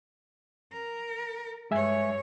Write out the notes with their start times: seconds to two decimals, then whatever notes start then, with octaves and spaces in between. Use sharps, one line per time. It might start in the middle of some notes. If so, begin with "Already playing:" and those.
0.73 A#4
1.71 G2 G#3 C#5 E5 G#5